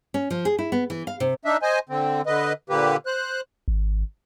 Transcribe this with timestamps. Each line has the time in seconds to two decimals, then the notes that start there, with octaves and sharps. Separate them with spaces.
0.14 C#4
0.30 F3
0.45 G#4
0.59 E4
0.72 B3
0.90 E3
1.07 F5
1.20 C3
1.45 D4 D#4 E5
1.62 C5 D#5 G#5
1.89 D3 C4
2.26 D3 B4 D#5
2.70 A#2 D3 A#3 G4 B4
3.06 C5 F#6
3.68 G#1